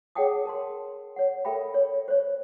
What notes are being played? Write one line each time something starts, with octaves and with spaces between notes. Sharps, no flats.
G#4 C#5 F#5 G5 A5 D#6
A#4 A5 C6
C#5 F#5
A4 A#4 E5 G5 B5
C#5
C5 C#5